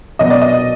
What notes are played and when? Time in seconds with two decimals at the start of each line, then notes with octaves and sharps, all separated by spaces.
0.19 B2 F#3 B3 D#5
0.30 D5
0.42 D#5